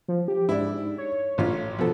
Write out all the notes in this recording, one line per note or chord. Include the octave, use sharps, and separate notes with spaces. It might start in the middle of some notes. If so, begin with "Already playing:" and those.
F3
G4
G#2 D4 E4
C#5
A1 F4
B2 F3 A4